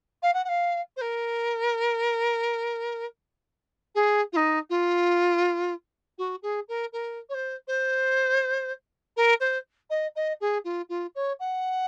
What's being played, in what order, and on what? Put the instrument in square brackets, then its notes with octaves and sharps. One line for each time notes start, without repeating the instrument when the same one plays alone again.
[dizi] F5
F#5
F#5
F5
C5
A#4
G#4
F4
D#4
F4
F#4
G#4
A#4
A#4
C#5
C5
C5
A#4
C5
D#5
D#5
G#4
F4
F4
C#5
F#5